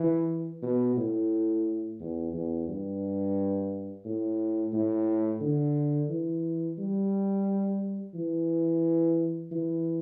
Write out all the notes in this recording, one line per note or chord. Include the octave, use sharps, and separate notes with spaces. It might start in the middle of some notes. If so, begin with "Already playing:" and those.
Already playing: E3
B2
A2
E2
E2
G2
A2
A2
D3
E3
G3
E3
E3